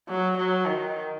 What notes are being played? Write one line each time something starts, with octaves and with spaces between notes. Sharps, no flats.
F#3
F#3
D#3